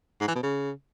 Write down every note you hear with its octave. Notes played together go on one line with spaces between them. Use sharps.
G#2
E3
B2
C#3